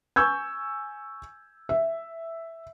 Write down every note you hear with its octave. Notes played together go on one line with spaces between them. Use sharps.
G#5 C#6 E6 G6 G#6
E5